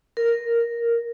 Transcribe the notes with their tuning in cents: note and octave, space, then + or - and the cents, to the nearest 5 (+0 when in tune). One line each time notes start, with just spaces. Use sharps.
A#4 -5